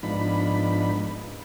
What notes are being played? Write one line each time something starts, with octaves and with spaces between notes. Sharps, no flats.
G#2 F3 B3 D4 D#4 B5